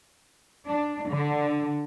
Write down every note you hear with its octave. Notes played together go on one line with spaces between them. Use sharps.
D4
D3